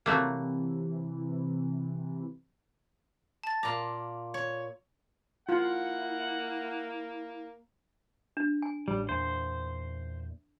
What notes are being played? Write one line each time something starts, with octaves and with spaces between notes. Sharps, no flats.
C3 E3 F#3 A3 A#3
A5 A6
A#2 F5 A#5 D6
C#5
A#3 E4 F4 F#5
D4
G#5
A1 G3
E2 A#2 C5